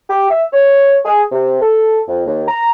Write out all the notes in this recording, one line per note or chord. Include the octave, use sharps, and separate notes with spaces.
G4
E5
C#5
G#4
C3
A4
F2
D#2
A#5